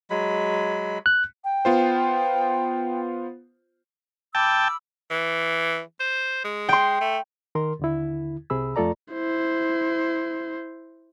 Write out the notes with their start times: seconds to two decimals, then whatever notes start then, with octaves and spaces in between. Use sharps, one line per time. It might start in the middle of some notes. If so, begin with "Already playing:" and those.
0.10 F#3 G#3 B5
1.06 F#6
1.44 G5
1.65 B3 F4 C5
4.35 G5 A5 B5 D6 E6
5.10 E3
6.00 C5
6.44 G#3
6.69 G5 C6
7.01 A3
7.55 D#3 A#4 C6
7.79 D#2 D3 E4
8.50 C2 C3 G#4 B5 E6
8.76 F2 A3 F4 A4 D5 A#5
9.13 E4 C5